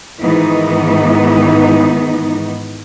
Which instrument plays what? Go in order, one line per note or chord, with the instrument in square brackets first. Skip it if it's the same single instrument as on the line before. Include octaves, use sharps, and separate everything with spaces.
[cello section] G#2 D#3 E3 B3 D#4